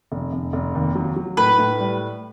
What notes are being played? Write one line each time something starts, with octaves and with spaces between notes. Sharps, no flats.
F1
F1
F1
D#2
F#3
F#3
A2 B4
A2
G3